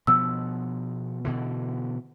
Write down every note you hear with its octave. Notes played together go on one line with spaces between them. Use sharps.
B2 F3 B3 E6
B2 D3 E3